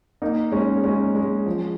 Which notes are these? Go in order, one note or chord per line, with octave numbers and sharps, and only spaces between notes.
A#3 D#4
G#3 C#4
G#3 C#4
G#3
F3